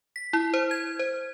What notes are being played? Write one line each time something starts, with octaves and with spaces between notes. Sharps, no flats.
B6
E4
C5
G#6
C5